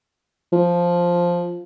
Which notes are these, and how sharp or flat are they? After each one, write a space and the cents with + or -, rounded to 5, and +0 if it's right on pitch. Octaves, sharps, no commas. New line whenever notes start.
F3 +0